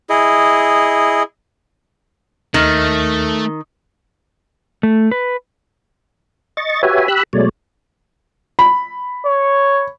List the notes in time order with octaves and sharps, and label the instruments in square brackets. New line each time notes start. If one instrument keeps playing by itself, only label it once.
[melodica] E4 G#4 D#5
[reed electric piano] D#2 F6 [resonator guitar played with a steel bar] D#3 [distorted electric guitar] A3
[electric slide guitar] A3
B4
[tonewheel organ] D#5 C#6 A6
F#4 G4 B4 C#5 E5 G#5
G4 B5 E6 F#6
B2 F#3 G#3 A3 C#5 D5
[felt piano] B5
[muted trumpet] C#5